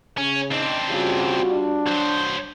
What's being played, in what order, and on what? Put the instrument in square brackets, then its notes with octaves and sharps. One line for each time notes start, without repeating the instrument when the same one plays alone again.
[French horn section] C#3 [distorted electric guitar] C#4
[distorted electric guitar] C4 D4 [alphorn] D#4
[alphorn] C#3 [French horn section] G3 F4 F#4
[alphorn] D4
[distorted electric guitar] F#3 C5